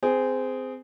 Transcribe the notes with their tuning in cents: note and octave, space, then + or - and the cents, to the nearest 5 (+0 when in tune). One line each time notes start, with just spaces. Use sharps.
C4 -20 G#4 +0